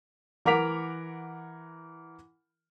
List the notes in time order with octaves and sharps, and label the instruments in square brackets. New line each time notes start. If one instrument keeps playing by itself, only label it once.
[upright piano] E3 A#4 F#5 D6 B6 F7